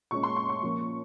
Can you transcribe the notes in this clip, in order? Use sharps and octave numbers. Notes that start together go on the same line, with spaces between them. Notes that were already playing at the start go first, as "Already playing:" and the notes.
A#2 G#3 C#4 C#6
C6
C#6
C#6
A#2 F3 A#3 C#4